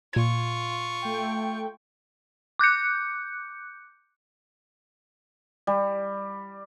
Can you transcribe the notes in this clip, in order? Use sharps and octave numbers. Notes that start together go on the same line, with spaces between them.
A#2 F4 C#6 G#6
A3 G5
D6 F#6 G6 C#7
G3